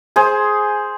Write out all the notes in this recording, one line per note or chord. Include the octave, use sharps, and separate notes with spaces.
G#4 C5